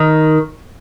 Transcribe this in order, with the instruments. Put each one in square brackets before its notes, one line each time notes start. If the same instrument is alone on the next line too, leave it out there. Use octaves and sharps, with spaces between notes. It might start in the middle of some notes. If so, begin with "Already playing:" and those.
Already playing: [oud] D#3